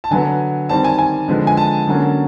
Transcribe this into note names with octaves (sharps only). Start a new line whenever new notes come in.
A5
D3 F#3 B3 G#5
D#3 G3 C4 A5
G#5
G#5
D3 F3 G#3 B3
G#5
A5
D3 F#3 A#3 C#4